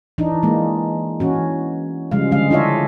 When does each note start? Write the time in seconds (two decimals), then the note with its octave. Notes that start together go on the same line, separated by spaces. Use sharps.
0.18 E3 D4 D#4
0.43 E3 G#3 A#3
1.20 E3 C#4 F#4
2.11 C#3 F3 G3 G#3 F5
2.31 D3 G#3 F5
2.51 D4 E4 F4 C#5 D#5 E5